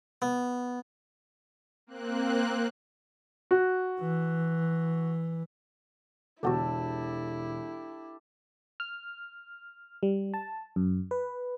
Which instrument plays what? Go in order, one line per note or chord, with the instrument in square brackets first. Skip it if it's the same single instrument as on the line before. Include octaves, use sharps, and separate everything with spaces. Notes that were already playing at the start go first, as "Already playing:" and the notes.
[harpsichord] B3
[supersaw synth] A#3 C4 F#6
[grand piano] F#4
[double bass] E3
[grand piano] E1 [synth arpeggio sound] D3 B3 F#4 [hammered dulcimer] D4 G4 A4 [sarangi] E4
[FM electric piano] F6
G3
A5
F#2
B4